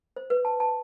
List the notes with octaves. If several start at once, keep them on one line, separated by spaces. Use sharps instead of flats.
C5
B4
A5
A5